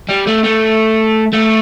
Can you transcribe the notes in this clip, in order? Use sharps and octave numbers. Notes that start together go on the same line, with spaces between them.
G3
A3
A3
A3